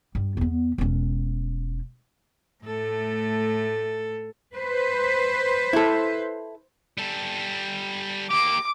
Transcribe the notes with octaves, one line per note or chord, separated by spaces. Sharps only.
G2
E2 B3
E1 C#4
A2 A3 A4
B4 C5
E4 A4
G3 A4
A#3 G4 D6